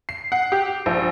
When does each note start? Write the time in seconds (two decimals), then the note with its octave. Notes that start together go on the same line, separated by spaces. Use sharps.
0.09 C7
0.32 F#5
0.52 G4
0.86 A#1